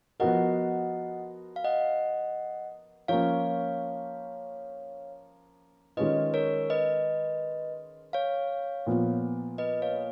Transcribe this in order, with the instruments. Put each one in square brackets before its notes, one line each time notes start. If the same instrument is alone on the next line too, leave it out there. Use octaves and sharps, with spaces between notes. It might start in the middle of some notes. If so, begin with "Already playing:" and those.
[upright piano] F3 B3 F#4 A#4 [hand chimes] D#5 F#5
[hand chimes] F5
D#5 F#5
[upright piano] F3 A#3 C#4 [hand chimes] C#5 F5
[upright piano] D#3 G#3 C#4 F4 [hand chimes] B4 D#5
[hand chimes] A#4 C#5
B4 D#5
C#5 F5
[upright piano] A#2 F3 B3
[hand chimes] B4 D#5
C#5 F5